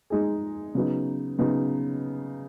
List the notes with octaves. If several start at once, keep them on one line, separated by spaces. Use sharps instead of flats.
G#3 D#4 G#4
C#3 F#3 B3 D#4
C#3 F#3 B3 D#4